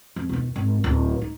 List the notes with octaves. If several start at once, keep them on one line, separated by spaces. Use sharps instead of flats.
F2
E1 D#3
G#1
D1
D#4